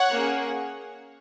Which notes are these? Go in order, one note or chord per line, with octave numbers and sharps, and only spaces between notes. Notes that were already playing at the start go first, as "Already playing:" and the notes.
Already playing: C#5 F#5
A#3 C#4 G#4